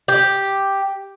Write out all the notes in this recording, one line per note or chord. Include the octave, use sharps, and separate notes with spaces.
G4